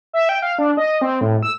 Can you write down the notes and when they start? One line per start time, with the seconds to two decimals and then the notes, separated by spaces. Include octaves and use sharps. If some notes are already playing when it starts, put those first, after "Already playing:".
0.13 E5
0.29 G5
0.42 F5
0.59 D4
0.77 D#5
1.01 C4
1.21 A2
1.43 E6